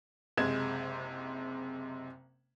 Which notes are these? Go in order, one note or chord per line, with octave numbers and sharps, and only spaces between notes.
F#1 C3 G#3 G#6 E7